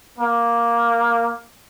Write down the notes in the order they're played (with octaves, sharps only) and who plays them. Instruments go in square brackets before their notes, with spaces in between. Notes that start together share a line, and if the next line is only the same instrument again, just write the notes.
[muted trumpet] A#3